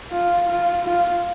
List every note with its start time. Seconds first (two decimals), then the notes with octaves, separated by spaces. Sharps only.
0.11 F4
0.48 F4
0.85 F4